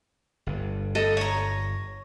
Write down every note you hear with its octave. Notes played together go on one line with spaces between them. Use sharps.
G1 G2
A4 D#5
C#5 A#5